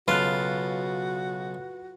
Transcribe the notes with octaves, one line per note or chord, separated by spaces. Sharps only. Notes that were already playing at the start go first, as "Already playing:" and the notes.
B1 C#3 F4 F#4 B4 A5 F#6